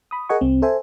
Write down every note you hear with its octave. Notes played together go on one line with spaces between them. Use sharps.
B5 D#6
G#4 A#4 D#5 F#5 G#5 C#6
C2 C4
A4 C5 E5 G#5